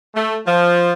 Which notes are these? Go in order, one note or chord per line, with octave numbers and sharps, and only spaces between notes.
A3
F3